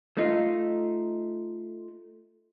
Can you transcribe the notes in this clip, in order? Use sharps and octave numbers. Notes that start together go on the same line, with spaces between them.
A3 D#4 F4